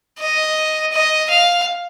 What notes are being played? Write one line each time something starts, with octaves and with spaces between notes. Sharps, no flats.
D#5
D#5
F5